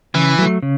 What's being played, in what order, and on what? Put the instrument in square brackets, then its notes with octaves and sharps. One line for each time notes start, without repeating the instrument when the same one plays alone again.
[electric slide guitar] C#3 [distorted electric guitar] E3
[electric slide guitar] F#3 A3
C#3